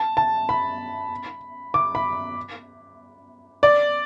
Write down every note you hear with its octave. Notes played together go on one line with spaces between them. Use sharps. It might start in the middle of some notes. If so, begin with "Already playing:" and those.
Already playing: A5
A5
B5
D6
B5
D5